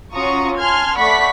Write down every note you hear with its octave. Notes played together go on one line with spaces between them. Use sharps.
C#4 F4 F#4 A#5 C#6 D#6
G#5 A5 C6 F6 G#6
A3 D5 F#5 B5 C#6 B6